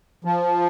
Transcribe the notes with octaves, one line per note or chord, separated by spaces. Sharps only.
F3